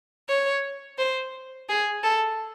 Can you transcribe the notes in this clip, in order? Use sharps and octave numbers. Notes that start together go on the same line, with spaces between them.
C#5
C5
G#4
A4